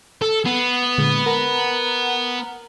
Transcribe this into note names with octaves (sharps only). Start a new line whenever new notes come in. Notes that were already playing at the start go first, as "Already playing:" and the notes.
A4
B3 C7
A#2 D3 G#3
A#4 F#5 A#5